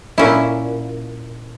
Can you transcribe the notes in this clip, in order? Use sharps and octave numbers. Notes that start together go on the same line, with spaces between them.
A#2 C#4 E4